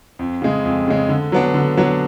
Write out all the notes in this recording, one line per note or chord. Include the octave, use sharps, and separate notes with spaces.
F2
C#3 G#3
F2
C#3 G#3
D3
F#3 B3 D4
D3
F#3 B3 D4